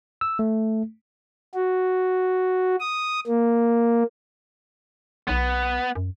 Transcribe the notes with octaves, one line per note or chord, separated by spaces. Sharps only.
E6
A3
F#4
D#6
A#3
B1 B3
F#2